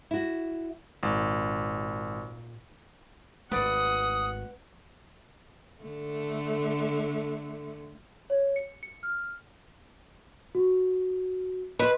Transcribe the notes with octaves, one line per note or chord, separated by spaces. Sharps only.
E4 F#4
G#1 A#2
G#1 A3 B4 D5 F#5 D#6
D3 A3
C#5
C#7
C#7
F6
F#4
B4 D#5 C6